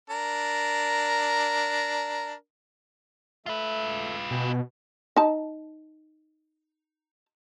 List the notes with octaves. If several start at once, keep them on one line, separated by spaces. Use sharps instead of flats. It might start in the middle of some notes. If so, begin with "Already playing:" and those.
D4 A#4
A3 F4 B4 E5
B2 G5 G#5
D#4 A5